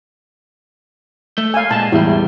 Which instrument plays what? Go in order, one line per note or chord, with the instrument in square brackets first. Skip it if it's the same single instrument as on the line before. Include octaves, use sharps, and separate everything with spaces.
[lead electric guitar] A3
[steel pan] F5 G#5
[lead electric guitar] A#2 G#3 [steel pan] A5
[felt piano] E2 [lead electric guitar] A2 G3 [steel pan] E4